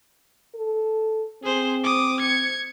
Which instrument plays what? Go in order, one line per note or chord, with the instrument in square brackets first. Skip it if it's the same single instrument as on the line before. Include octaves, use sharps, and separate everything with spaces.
[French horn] A4
[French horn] C4 [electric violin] G#4 C5
[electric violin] D6 D#6
G#6 C#7